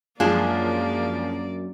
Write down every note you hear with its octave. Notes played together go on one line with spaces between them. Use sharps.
F#2 F3 G#3 A#3 D4 F4 G#4 D5